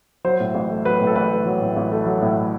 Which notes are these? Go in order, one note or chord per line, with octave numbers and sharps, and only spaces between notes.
F#3 C5
A2
A1
A3
F#3 B4
A2
A4
A1 B4
A3
F#3
A2
A1
A3
F#3
A2